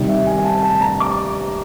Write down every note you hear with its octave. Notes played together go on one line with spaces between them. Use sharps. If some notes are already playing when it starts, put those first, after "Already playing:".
Already playing: C3 D#3 G3 C4
E5
G#5
G#5
A5
A5
A#5
D6